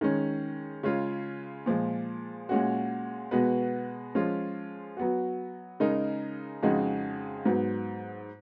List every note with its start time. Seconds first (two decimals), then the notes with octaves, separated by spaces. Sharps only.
0.01 D#3 G#3 C#4
0.83 C#3 G#3 C#4 F4
1.66 A#2 F3 G#3
2.49 A#2 G#3 C#4 F#4
3.31 B2 G#3 B3 F#4 B4
4.15 F3 G#3 C#4 F4
4.97 F#3 B3 F#4
5.80 C#3 G#3 D#4 A#4
6.63 F2 C#3 G#3 D#4 F#4
7.45 G#2 F#3 B3